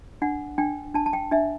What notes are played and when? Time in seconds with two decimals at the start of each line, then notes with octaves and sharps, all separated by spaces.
0.22 D4 F#5
0.58 D4 G5
0.94 D4 A5
1.06 A5
1.13 G5
1.31 D4 E5